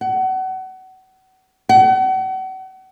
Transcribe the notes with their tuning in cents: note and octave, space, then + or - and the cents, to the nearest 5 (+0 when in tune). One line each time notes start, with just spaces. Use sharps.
F#5 +30
F#5 +40